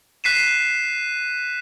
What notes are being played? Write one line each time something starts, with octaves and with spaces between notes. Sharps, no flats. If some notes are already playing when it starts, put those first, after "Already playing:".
F#6 B6 C7 D#7 E7